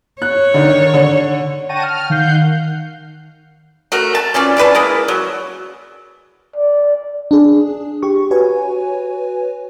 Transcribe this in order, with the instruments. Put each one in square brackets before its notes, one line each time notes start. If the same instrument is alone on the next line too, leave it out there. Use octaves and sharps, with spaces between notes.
[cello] C#5 [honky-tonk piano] F#6
[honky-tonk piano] D3 D#3
D3
[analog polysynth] F#5 G5 A5 C#6 A#6 D#7
F6
D#3 F5 F#5 G6 C7
[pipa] A3 F#4 A#4
A5
E3 C#4 F4 D5
E3 D4 B4 A5
G#3 A#3 E4
F#3
[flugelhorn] D5
[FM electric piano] D4 G#4
G4 C#6
F#4 B4 C#5 G#5